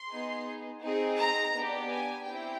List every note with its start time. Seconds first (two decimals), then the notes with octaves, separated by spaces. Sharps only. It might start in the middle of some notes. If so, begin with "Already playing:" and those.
Already playing: C6
0.10 B3 D#4 G#4
0.81 C4 D#4 G#4
1.18 A#5
1.54 B3 D4 G4
1.90 G#5
2.26 C4 E4 G4 G5